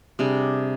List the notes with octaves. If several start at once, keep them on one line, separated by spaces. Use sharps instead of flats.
C3 G3 D4 G#4